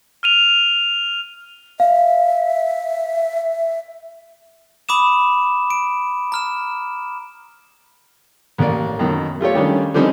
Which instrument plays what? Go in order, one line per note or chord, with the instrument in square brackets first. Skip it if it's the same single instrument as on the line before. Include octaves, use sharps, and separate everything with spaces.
[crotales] F6 D#7 F7
[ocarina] E5 [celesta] F5
[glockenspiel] B5 D6 D#6 E7
D7
A#5 F6 E7
[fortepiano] A1 A#3 D5
F#2 B2 D#3
A3 F4 G4 C#5
D#3 G3 C#4 D4
D3 F3 G3 C4 C#4 D#4